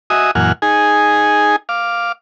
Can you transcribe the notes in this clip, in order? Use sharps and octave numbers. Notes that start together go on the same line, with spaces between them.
F#4 D#5 E5 G#5 D#6
F#2 A#2 E3 F#5 G#5 F6
D#4 G#4 G#5
F5 D6